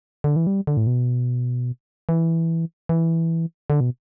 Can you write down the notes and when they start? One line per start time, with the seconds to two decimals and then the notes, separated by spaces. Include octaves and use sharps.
0.24 D3
0.36 E3
0.47 G3
0.67 D3
0.77 A2
0.87 B2
2.09 E3
2.89 E3
3.70 D3
3.80 B2